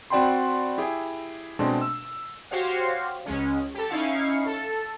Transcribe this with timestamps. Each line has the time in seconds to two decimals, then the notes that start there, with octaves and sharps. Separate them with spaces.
0.10 C4 F#4 D5 G5 B5 C6
0.78 E4 G4 G#4
1.59 B2 G#3 A3 C4 D4
1.81 E6
2.51 F#4 G4 C5 C#5 F5
3.26 C#2 G#3 C#4
3.74 G4 A4
3.89 C#4 D#4 E4 F5 C#6
4.46 A4